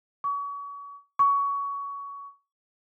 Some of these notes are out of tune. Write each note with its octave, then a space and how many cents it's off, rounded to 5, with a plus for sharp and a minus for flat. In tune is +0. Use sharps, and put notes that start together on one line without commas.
C#6 +35
C#6 +20